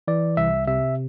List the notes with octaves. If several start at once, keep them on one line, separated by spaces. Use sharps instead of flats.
E3 D5
C2 E5
C3 E5